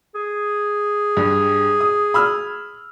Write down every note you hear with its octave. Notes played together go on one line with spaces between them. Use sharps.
G#4
G2
D#6
B5 E6 F6